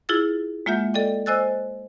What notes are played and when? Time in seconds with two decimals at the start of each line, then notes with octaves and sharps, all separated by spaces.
0.09 E4 F4 G#4 E6 A6
0.66 G#3 A#3 F4 E5 F#5 G6
0.94 A4 D5 D#5 G5
1.26 C5 D#5 G#5 E6 F#6 A6